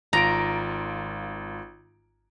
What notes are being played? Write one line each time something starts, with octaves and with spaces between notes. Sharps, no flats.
G#1 F4 A#5 D7